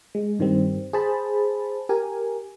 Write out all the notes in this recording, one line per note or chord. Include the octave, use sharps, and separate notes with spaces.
G#3
G2 D#3 G3 C4
G#4 C5 A5 B5
G4 A#4 G#5